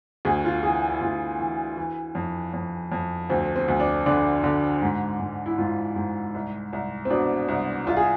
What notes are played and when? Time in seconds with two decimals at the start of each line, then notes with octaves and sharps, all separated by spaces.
0.25 D2 G#4
0.45 F4
0.63 E3 G#4
0.90 E4
1.01 D2 F4
1.39 E3
1.77 E3
2.15 F2
2.53 F2
2.92 F2
3.29 D2 C4
3.56 C4
3.68 D2
3.80 D4
4.06 D3 D4
4.44 D3
4.82 G#2
5.20 G#2
5.46 E4
5.58 G#2 F4
5.96 G#2
6.34 C2
6.73 C2
7.05 C4
7.10 B2 D4
7.48 C2
7.87 C2 F4
7.97 G#4